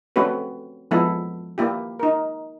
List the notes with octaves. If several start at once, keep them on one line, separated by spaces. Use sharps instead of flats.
A3 C4 C#4 F#4 B4
F3 G#3 B3 E4 A4
A#3 E4 G4
D#4 A#4